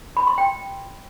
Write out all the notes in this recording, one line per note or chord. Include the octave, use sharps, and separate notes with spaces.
B5
C6
G5